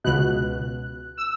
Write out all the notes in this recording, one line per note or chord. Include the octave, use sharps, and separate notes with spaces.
C#2 B2 F#6
E6